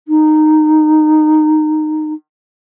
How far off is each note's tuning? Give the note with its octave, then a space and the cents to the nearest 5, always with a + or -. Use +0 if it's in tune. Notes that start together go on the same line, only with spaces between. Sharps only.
D#4 -15